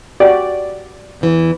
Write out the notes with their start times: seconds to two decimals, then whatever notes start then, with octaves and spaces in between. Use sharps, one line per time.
0.20 F#4 G4 D5
1.21 E2 E3